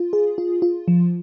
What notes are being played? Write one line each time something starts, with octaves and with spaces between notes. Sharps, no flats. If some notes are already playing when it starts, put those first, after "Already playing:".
Already playing: F4
G#4
F4
F4
F3